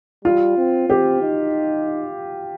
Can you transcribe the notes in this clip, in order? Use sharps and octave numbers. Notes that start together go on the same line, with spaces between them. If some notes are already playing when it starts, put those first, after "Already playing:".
G3 F4
C4
C4 G4
D#4